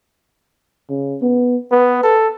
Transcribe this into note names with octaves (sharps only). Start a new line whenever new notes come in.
C#3
B3
B3 B4
A4